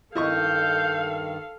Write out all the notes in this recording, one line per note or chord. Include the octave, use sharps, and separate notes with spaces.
G2 D#3 E4 A4 D#5 F5 C#6 G6